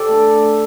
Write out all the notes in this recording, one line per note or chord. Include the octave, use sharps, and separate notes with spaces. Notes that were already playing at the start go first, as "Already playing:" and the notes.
Already playing: G4 A4 C5 D5
A3 D4